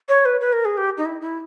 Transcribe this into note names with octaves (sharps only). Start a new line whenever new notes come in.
C#5
B4
B4
A#4
G#4
G4
D#4
E4
E4